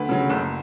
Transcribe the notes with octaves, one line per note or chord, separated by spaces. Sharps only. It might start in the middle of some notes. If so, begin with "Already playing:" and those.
Already playing: D2 B4
C#3 F#3
F#1